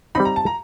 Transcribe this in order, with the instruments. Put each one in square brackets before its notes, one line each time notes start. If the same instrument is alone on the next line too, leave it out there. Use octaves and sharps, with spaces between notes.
[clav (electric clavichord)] G3 C4 D#4 [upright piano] B5
[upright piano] A#5
A5
A#5